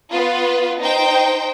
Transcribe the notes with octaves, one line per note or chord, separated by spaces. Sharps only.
B3 F4 B4
D#4 C5 G5